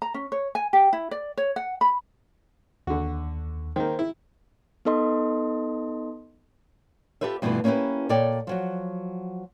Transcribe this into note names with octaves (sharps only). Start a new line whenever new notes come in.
A#5
C#4
C#5
G#5
G4
E4
D5
C#5
F#5
B5
D#2 D3 F#4
D#3 A#3 C5
E4
B3 D#4 A4 D#5 C6
F4 G4 A4 B4 C5 E5
G2 B2 E3 A3 F4 B4
A#3 C#4 D#4 E4 G4 B4
A#2 A4 C#5 D5 G5
F3 F#3 F#4